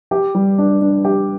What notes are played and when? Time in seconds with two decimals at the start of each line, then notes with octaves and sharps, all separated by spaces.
0.11 G4
0.35 G3
0.58 D4
0.81 D4
1.05 G4